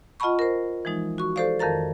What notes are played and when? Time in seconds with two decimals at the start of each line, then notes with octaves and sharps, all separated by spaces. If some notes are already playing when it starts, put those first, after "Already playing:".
0.20 F4 D#5 F#5 A5 B5 C#6
0.39 A#4 C5
0.85 E3 F3 G#3 D#4
1.18 F#4 C#6
1.36 G4 A4 C5 D5 F5
1.59 F2 D#3 A#4 F5 A#5 A6